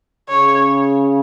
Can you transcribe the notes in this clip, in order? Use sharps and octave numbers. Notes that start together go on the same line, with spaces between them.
C#3 C#5